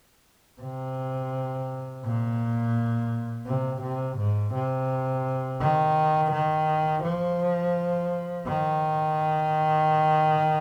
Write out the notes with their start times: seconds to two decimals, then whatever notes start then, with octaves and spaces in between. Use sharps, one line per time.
0.61 C3
2.04 A#2
3.46 C3
3.82 C3
4.18 G#2
4.54 C3
5.60 D#3
6.32 D#3
7.03 F3
8.46 D#3